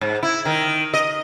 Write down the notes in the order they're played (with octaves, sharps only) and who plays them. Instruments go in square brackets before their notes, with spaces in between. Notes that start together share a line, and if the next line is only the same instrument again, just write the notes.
[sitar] G#2
E4
D#3
D#5